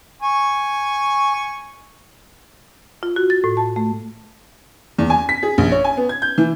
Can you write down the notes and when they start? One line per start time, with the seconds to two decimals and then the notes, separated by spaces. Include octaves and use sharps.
0.22 G#5 C#6
3.03 F4
3.16 F#4
3.30 A6
3.44 A2
3.57 A5
3.76 A3
4.98 E2
5.10 G#5
5.29 B6
5.43 G#4
5.58 A#1
5.72 C#5
5.84 G#5
5.97 B3
6.09 G#6
6.22 G6
6.38 E3